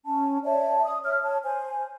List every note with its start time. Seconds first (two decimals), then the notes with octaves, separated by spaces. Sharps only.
0.05 C#4 A5
0.44 C#5 D5 E5 A5
0.84 D#6
1.04 C#5 E5 F6
1.22 C#5 A5
1.44 C5 G#5